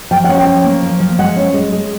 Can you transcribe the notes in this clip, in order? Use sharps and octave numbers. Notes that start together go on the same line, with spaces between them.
F3 G5
C#4 F#5
G5
F3
A#3
F3
F3
G#3 F#5
C#4
G#3
G#3